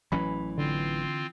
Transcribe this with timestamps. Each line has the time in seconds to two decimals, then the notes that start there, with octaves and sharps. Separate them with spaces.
0.12 A1 E3 F#3 C#4 B5
0.58 D3 C4 F4